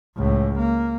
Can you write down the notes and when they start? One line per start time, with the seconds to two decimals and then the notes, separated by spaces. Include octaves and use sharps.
0.17 C#2 A2
0.58 A#3